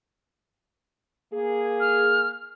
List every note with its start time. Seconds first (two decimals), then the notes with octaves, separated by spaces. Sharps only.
1.33 A#3 G#4
1.80 F6